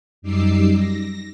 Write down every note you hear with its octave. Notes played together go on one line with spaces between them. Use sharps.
F#2 G3 D#4 D6 E6 C7
A#6